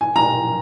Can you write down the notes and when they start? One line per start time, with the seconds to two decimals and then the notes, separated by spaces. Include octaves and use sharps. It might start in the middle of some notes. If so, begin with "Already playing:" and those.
0.01 G#5
0.16 A#5